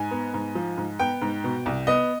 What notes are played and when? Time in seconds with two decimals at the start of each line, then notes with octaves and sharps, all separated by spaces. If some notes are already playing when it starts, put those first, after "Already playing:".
Already playing: G#2 G#5
0.11 B3
0.34 G#2
0.55 F3
0.78 G#2
0.99 B3 G5
1.22 G#2
1.44 B2
1.66 C2
1.87 B3 D#5